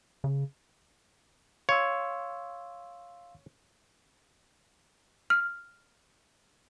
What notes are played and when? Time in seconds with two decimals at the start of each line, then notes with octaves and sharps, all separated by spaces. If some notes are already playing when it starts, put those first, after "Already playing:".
0.24 C#3
1.69 C#5 F5 C6 E6
5.30 F6